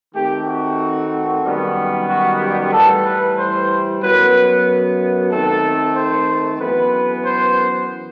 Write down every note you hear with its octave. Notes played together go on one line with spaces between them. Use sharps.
D#3 A3 C4 G4
F#4
F#2 D#3 G3 B3
F#4
G4
A2 E3 G3 A4
B4
C5
F#2 F#3 B3 B4
D#3 A3 C4 A4
C5
F#2 E3 B3 B4
C5